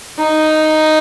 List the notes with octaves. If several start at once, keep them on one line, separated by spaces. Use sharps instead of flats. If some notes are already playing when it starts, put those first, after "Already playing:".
D#4